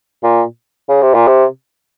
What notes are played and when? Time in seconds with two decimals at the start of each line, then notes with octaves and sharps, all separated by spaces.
0.23 A#2
0.89 C#3
1.02 C3
1.14 A#2
1.27 C3